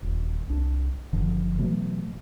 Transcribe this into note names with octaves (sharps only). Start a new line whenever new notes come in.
D#1
C2 D4
F#1 D3 F3
B2 E3 F#3 A3